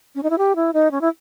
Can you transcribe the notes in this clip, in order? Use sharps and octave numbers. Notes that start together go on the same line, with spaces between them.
C#4
D#4
E4
G4
E4
D#4
C#4
E4